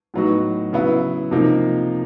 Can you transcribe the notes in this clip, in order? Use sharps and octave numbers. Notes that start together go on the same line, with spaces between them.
A2 F#3 B3 D#4 F#4
C#3 F#3 B3 E4
C3 F3 A#3 D#4